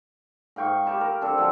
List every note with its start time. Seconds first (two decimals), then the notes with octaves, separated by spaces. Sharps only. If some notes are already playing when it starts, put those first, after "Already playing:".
0.56 G#2 F5 G5 C#6
0.85 G4 A5 B5
1.01 A#4
1.21 C4 D4 A4
1.38 F3 F#3 E4